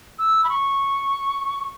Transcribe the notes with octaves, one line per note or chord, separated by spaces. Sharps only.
E6
B5
C#6